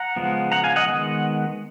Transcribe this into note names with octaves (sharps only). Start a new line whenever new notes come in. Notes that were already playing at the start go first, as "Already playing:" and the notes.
Already playing: F#5 A#5
C#3 F3 G#3 B3
F#5 A#5
F5 G#5
D#5 F#5
D#3 G#3 B3